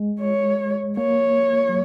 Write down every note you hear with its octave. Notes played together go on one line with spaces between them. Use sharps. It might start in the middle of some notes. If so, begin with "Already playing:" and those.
Already playing: G#3
C#5
A#3 C#5
F#3